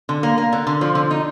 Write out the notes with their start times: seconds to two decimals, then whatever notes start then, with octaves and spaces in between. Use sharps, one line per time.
0.09 D3
0.23 A#3
0.38 A#3
0.53 D3
0.67 D3
0.81 F3
0.95 D3
1.11 D#4